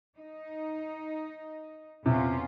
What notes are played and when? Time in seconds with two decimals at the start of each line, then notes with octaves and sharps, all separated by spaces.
0.18 D#4
2.06 E2 C3 C#4 F4